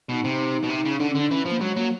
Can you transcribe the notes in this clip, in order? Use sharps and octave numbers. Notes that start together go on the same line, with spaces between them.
B2 D#4
C3
B2
C3
C#3
D3 D4
C#4
D3
D4
E3 C#4
F3 A#3
F#3 G#3
F#3 A#3